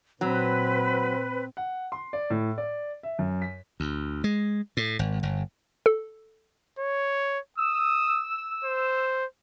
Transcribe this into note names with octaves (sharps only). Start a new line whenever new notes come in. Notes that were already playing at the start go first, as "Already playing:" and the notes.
A#2 F#3 C4 B4
F#5
C6
D5
A2
D5
E5
F#2
B6
D2
G#3
A2
G#1
G1
A4
C#5
D#6 E6
C5